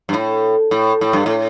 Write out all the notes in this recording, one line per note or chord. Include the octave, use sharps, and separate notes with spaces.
G2
A2
A2
A2
G2
A2